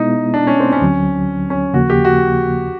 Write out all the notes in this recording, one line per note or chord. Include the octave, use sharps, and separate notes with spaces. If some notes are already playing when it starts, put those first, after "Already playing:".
Already playing: B2 G#3 B3 D#4 E4
D4
C#4
C4
C#4
D2 D3 F#3
C#4
D#2 C#3 F3 A#3 F#4
G4
F#4